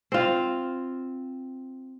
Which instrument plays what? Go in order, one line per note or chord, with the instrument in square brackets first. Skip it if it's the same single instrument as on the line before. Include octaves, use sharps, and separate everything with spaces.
[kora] C4 F4